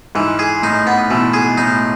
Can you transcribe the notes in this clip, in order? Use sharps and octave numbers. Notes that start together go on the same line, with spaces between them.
G#2 E3
G#4
A2 D#4
B3
B2 E3
G#4
A2 D#4